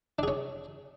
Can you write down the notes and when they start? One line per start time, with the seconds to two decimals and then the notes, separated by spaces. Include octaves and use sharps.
0.19 D4
0.23 G#4
0.28 C#4